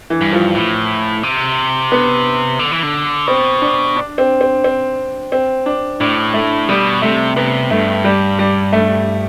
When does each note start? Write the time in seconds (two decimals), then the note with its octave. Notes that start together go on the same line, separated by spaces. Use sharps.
0.10 E3
0.21 G2
0.33 F3
0.55 A2
1.23 C3
1.92 B3
2.59 D3
2.71 E3
2.83 D3
3.27 B2 C4
3.62 D4
3.97 D4
4.18 C4
4.41 C4
4.64 C4
5.32 C4
5.66 D4
6.00 A2 D4
6.34 A3
6.68 B2 G3
7.02 C3 A3
7.36 C3 B3
7.70 G2 A3
8.05 G3
8.39 G3
8.73 A3